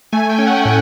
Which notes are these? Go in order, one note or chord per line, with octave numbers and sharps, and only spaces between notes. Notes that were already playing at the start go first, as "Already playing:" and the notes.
A3 G#5
G5
C#4
F#5
A2 G5